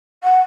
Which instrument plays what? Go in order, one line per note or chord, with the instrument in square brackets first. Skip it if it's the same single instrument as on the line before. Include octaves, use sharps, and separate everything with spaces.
[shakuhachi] F#5